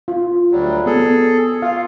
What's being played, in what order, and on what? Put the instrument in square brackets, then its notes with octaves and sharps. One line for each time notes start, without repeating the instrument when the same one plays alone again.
[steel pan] F4
[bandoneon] D2 F#3 G3
[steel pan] B3 [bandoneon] G#4 A4
[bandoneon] F4 [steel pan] F5